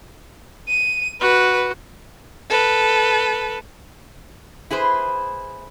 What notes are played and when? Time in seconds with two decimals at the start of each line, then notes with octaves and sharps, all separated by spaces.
0.68 D#7
1.21 F#4 B4
2.50 A4 B4
4.71 E4 G#4 B4 C5